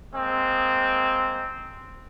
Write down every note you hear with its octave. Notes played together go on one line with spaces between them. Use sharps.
G#3 A#3 C4